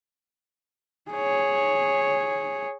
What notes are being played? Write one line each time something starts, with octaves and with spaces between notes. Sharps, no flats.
G#4 C#5